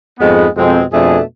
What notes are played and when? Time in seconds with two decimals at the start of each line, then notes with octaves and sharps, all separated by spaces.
0.20 F2 G#2 G#3 B3
0.56 F2 B2 G#3 C4 G#4
0.92 F2 B2 A3 D4 G#4